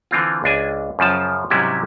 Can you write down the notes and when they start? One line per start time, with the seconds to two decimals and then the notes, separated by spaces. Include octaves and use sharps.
0.11 D3 E3 C4 F4
0.44 C#2 D4 G#5
0.99 F#2 C#3 F3 A5
1.50 G#2 C3 F#3 G3 C#4 E4